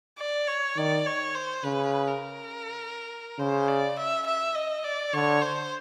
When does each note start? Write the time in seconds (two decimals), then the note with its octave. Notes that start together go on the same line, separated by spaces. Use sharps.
0.19 D5
0.48 C#5
0.77 D#3 D5
1.06 C#5
1.35 C5
1.64 C#3 B4
2.08 A#4
3.39 C#3 C5
3.68 D5
3.97 E5
4.27 E5
4.55 D#5
4.84 D5
5.13 D3 C#5
5.42 C5